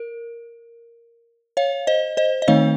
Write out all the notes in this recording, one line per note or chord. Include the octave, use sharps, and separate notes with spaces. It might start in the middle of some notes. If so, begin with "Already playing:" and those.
Already playing: A#4
C#5 F5
C5 D#5
C5 D#5
D#5
D#3 A3 C4 D#4 C#5 F5